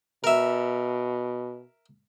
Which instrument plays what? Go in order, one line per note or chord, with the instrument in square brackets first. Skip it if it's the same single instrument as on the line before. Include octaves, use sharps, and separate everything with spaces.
[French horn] B2 [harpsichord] A#4 E5